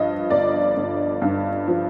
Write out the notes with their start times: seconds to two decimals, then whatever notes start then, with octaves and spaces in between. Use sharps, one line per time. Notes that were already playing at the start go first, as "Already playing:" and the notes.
Already playing: G2 F3 D#5
0.30 G1 D5
0.77 G1
1.22 G2
1.68 F3